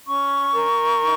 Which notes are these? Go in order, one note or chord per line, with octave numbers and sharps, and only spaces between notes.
C#4 C#6
A#4
D#4